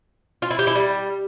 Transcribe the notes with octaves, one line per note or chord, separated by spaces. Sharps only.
F4
E4
G4
E4
G3